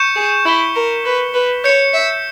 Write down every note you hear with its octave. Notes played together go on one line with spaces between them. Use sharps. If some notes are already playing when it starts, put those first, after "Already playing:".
Already playing: C#6 G6 C#7 E7
G#4
E4 G6 B6 G7
A#4
B4 C#6 G6 B6
B4
C#5 G6 C#7 E7
E5